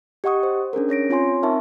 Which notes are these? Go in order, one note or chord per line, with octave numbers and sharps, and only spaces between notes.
G4 D#5 F#5 C#6 D#6
C5
C#4 D4 G#4 A#4
C#4 C#5 A#6 D7
C4 F4 C#5 G#5 C6
C4 D#4 A#4 E5 A5 C#6